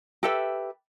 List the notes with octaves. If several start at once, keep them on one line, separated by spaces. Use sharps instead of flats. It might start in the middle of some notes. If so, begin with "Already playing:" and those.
G4 A4 B4 E5